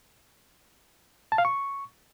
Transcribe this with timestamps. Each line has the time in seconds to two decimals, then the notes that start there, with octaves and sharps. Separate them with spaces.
1.32 A5
1.38 F5
1.45 C#6